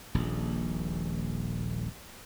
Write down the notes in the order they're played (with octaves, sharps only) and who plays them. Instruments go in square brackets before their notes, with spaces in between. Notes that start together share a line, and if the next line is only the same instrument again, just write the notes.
[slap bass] D#1 A#1